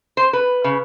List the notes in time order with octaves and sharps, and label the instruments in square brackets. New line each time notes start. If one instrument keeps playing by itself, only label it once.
[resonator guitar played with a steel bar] C5
B4
C#3